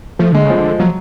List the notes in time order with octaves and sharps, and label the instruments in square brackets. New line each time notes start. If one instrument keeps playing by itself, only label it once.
[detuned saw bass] F3 [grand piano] A3
[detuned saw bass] D3 [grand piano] G#3
[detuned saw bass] C#3 [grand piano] F3
[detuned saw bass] D3
[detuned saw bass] F3 [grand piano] F#3